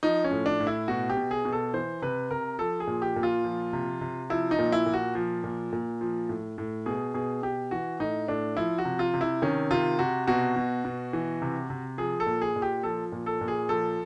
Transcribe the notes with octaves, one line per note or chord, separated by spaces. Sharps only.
F3 D#4
C#4
A2
D4
A2
E4
B2 F#4
G4
B2
G#4
B2
A4
E3 C5
C3 B4
C3 A#4
F3 A4
G#4
A#2
G4
A#2
F4
F3
C3
C3
F3 E4
D#4
A#2
E4
A#2
F#4
F3
A#2
A#2
F3
A2
A2
B2 G#4
B2 G#4
B2 G4
E3 F#4
A2 D#4
A2 D4
F3 E4
F#4
C3
F4
C3
E4
D#3 C#4
C3 F4
C3 F#4
B2 F#4
B2
B2
E3
C3
C3
F3 G#4
A4
A#2
G#4
A#2
G4
F3 A4
A#2
A4
A#2
G#4
F3 A4